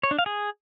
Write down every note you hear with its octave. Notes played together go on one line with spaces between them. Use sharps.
C#5
D4
F5
G#4